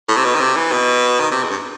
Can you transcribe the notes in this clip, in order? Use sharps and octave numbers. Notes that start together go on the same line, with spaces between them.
A2
C3
B2
D#3
C3
E3
B2
D#3
C3
E2
G2